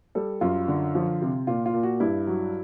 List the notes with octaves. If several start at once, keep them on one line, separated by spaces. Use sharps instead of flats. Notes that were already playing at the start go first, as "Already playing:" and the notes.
G3 A4
F#2 F4
D3
F3
C3
A#2 F4
F4
A#2
F#4
G2 E4
F#3